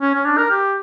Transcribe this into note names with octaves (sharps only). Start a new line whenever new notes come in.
C#4
C#4
D4
A#4
G4